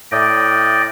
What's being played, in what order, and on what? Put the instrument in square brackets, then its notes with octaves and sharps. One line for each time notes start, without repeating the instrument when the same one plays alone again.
[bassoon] A2 [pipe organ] D5 D#5 G5